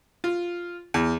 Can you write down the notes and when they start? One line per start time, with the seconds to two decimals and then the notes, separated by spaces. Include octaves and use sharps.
0.24 F4
0.94 E2